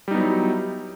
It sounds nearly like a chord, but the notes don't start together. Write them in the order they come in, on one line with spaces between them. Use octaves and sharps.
G3 D#4 B3 F#3 E4